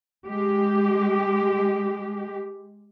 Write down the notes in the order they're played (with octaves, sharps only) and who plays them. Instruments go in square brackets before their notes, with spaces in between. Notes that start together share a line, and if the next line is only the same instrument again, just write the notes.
[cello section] G#3 G4